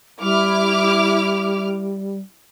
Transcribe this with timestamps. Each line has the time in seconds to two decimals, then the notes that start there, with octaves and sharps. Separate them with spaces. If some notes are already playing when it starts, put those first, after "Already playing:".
0.21 G3 E4 D6 F6